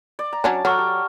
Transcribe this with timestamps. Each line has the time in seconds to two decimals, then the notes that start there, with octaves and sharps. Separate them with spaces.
0.19 D5
0.33 A#5
0.44 F#3 C#4 D4 A5
0.65 F#3 A4 F#5 A#5 C#6 F6
0.78 G4